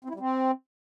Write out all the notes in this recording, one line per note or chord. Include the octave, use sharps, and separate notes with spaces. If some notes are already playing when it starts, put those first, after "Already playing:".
C4
E4
G3
C4